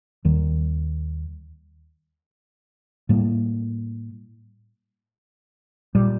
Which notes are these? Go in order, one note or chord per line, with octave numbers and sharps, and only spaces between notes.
D#2 D#3 G3
A2 G3 A#3
A#2 G3